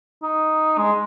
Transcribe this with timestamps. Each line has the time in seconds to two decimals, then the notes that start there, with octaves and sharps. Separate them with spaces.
0.23 D#4
0.78 G#3